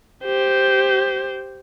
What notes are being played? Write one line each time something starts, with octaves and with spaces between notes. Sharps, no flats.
G4 C5